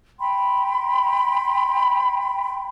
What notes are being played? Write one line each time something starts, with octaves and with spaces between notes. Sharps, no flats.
G5 B5 C6